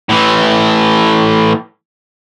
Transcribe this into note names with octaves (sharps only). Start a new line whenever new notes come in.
A2 E3